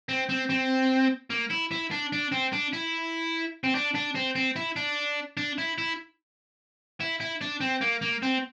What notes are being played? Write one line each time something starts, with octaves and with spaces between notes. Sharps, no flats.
C4
C4
C4
A#3
E4
E4
D4
D4
C4
D4
E4
C4
D4
D4
C4
C4
E4
D4
D4
E4
E4
E4
E4
D4
C4
A#3
A#3
C4